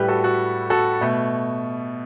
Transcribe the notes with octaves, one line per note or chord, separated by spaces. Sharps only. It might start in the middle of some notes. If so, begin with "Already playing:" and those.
Already playing: A2 G3 G4 B4
F#4 A4
F#4 A4
F#4 A4
B2 A3